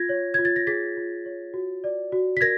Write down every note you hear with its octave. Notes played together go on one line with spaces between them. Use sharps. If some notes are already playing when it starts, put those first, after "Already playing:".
Already playing: F4 G#6 A#6
C#5
F4 G#6
A6
A#6
G#4 A6 B6
F4
C#5
F#4
D5
F#4
B6
A#4 G#6 A#6